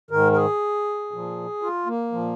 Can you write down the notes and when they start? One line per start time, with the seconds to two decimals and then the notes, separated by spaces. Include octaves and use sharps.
0.11 G#2 D#3 A#4
0.32 A#4
0.36 G#4
1.12 A#2 F3
1.62 F4
1.86 A#3
2.12 A#2 F3